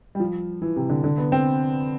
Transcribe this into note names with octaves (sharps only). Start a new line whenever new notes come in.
G3
F3
E3
C3
D3
D3
B3
C4